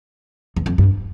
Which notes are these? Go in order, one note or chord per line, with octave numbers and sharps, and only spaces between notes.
E2
F2
G2